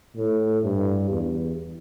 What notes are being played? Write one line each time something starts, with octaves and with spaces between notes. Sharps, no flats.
A2
G2
E2